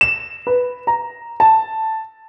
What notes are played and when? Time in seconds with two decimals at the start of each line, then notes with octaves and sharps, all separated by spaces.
0.01 E7
0.47 B4
0.87 A#5
1.40 A5